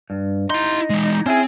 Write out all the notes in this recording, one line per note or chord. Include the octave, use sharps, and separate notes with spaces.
G2
D#4 E4 C6
E3 G#3
C4 C#4 E4 G#4